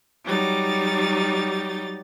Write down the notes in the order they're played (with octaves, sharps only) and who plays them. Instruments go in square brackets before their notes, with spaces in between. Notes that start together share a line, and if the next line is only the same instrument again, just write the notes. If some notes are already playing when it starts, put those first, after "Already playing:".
[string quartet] F#3 G3 D#4 A6